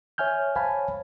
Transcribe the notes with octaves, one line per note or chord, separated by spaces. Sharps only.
C#5 E5 G#5 F6 G6
C5 C#5 F5 G#5 A5 B5